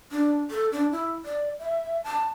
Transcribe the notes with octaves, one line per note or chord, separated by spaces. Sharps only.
D4
A4
D4
E4
D5
E5
A5